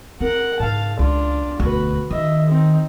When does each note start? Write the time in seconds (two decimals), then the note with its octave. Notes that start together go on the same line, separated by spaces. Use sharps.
0.21 C4 A#4 F#5
0.60 G#2 C#3 F5 A5
0.99 C#2 D4 F4
1.59 E1 D2 F#4 B4
2.10 D#3 D#5 E5
2.49 C4 D#4